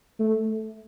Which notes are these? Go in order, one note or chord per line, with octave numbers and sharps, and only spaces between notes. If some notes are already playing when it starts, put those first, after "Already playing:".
A3